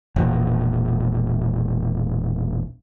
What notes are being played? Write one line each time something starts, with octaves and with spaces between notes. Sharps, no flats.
E1 A#1 A#2